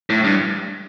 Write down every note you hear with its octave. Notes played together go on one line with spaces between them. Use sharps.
A2
G2